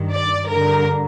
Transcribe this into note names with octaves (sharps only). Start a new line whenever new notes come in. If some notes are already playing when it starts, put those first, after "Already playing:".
Already playing: G2 D#3
D5
G2 D3 A#4